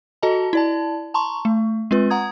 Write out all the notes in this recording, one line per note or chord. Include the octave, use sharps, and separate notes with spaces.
F#4 A4 D#5 A5 A#5
E4 D5 A5
A5 A#5 C6 C#6
A3
G#3 C4 F4 B4
F#5 A#5 D#6 G#6